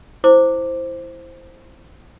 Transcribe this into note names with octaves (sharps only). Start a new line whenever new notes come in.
E4 C5 D6